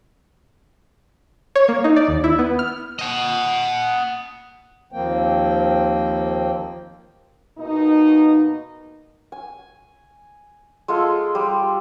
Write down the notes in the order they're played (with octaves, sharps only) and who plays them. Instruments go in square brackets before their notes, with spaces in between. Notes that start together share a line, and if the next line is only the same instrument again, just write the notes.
[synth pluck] C#5
A#3
D#4
D5
D#2
E4
B3
F6
[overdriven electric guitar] D#5 F#5
[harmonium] D#2 F3 A#3 C4 G5
[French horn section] B2 A#3 D#4
[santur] G#5
G#3 F4 A4
G3